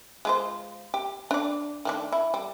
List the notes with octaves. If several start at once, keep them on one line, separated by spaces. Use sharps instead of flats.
G#3 F4 C5
G4
D4 D5
D#3 A3 D4
E4
G3